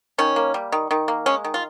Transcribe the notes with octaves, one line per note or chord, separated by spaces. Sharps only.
D#3 C#4
A#3
G3
D#3
D#3
A#3
G#3 C#4
D#3
F4